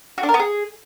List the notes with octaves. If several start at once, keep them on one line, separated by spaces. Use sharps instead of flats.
F#4
D4
A#4
B3
G#4